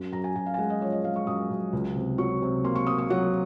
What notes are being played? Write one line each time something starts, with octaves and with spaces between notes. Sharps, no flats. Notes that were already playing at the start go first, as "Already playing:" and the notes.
Already playing: F#2
F#2 A#5
G#5
F#2 G#5
F5
G#5
G#3 F#5
D#5
F3 C#5
D#5
G#3 F5
C#6
F#2 D#6
F#2
C#2
C3
F#3 C#6
C3
A#3 C6
C#6
A#3 D#6
C#6
F#3 F#5